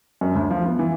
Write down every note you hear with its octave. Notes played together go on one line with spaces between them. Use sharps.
F#2
D2
F3
B3
E3